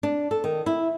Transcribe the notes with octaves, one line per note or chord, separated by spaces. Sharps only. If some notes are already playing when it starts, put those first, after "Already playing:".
D4
A4
D#3
E4